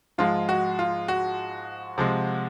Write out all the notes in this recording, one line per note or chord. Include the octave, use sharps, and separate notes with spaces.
G#2 F3 G#3 F4
F#4
F4
F#4
C3 F3 G#3